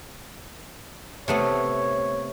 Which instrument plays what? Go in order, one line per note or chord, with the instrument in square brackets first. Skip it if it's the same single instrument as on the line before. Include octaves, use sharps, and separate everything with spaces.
[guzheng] C3 A3 B3 [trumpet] C#5